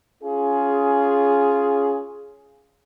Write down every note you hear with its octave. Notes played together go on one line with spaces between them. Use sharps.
C#4 F4 G#4